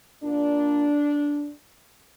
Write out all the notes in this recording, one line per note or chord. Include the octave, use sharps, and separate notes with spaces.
A#2 A#3 D4